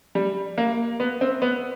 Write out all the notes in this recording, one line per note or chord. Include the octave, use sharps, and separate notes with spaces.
G3
A#3
B3
C4
B3